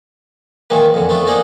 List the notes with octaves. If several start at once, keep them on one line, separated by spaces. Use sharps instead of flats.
A#2 D#3 E3 G#3 A#3
F2 D3
F3 A3 B3 D4 F4
A#3 D4 D#4 G#4 D5 D#5